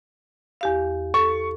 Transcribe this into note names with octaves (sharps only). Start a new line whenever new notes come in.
E2 G4 F5
A4 C#6